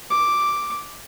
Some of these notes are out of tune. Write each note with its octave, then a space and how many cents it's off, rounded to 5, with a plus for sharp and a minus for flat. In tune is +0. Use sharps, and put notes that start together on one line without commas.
D6 +0